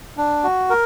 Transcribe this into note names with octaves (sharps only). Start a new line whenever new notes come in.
D4
F#4
A#4